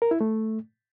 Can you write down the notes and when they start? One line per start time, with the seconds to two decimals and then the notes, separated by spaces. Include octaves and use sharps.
0.02 A#4
0.11 E4
0.21 A3